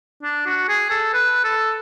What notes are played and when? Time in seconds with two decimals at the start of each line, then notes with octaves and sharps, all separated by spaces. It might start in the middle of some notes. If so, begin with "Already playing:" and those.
0.23 D4
0.46 F#4
0.69 G#4
0.90 A4
1.14 B4
1.44 A4